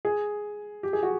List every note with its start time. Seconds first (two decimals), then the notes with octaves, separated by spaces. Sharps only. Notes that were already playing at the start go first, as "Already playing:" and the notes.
0.05 G#4
0.83 G4
0.93 G#4
1.03 F#4